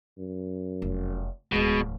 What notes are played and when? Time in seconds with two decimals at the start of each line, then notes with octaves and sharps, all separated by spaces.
0.18 F#2
0.82 F1
1.52 D1 E2 B2 G#3